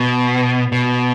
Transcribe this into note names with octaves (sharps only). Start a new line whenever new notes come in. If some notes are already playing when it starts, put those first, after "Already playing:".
Already playing: B2
B2